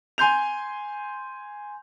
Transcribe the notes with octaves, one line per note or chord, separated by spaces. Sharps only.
G#5 C6 G6 F7